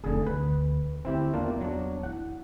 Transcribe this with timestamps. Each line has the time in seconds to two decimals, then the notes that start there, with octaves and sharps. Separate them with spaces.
0.04 F1 D3 A3 G#4
0.27 D2 B4
1.05 D2 C4 E4 G4
1.34 E2 A#3 D4 F4
1.60 F#3 D4
2.03 E4 F#5